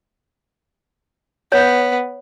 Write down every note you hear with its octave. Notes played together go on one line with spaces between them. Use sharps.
B3 C#5